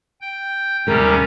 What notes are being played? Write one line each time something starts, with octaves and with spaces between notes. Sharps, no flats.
G5 G6
D#2 C3 G3 C#4 A#4